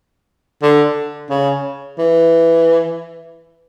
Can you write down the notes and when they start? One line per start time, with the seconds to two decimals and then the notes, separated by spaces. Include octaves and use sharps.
0.63 D3
1.30 C#3
1.99 E3